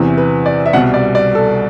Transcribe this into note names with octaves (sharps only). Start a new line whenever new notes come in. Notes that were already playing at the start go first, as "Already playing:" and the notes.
Already playing: E2 C3 E3
B4
D5
E5
C2 B2 G3 F#5
D5
D5
A4